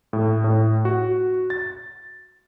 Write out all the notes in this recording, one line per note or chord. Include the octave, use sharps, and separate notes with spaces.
A2
A2
F#4
A6